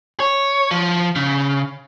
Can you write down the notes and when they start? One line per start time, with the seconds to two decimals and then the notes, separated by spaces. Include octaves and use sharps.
0.20 C#5
0.71 F3
1.16 C#3